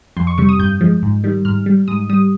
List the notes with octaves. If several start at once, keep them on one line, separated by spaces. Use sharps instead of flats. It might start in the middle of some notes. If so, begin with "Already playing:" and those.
F2 C6
C#6
C3 G3 C#6
D#6
G2 G6
F3 G#3
G#2
D#3 G3
G#2 F6
G3
G#2 D#6
G3 D#6